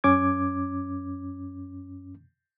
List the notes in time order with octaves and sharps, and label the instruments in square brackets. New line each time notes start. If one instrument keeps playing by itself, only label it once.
[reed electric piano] F#2 C#4 D6 G#6